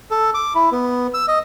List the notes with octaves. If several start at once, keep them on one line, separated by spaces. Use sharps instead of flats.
A4
D6
E4
B3
E6
D#5